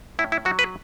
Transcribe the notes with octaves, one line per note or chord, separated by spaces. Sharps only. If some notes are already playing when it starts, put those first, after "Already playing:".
A2 E4
E4
F#3 F#4
B4